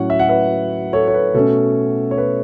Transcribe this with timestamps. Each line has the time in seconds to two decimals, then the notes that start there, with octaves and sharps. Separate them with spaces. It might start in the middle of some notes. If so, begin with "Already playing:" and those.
Already playing: A2 F#3 C#4 C#5 F#5
0.10 E5
0.19 F#5
0.29 B4 E5
0.93 A4 C#5
1.08 C#5
1.14 B4
1.34 B2 A3 C#4 A4
2.11 C#5
2.18 B4